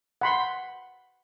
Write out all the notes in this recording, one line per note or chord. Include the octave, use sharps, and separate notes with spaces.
F#5 B5 C6